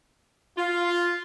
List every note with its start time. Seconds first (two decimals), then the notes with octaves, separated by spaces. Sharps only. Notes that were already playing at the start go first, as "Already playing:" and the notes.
0.57 F4